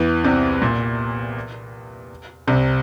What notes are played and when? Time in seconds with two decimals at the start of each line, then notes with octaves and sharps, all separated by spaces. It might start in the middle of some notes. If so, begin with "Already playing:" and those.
Already playing: E2 E3
0.24 C2 C3
0.62 A#2
2.47 C2 C3